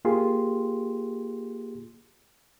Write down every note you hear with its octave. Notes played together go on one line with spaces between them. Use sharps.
A#3 F4 G4 G#4 C6